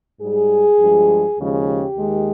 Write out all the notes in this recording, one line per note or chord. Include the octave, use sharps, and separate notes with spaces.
G#2 G3 G#4
G2 F3 G#3
D#2 C#3 F3 G#3 G4
G4
D#2 D#3 G#3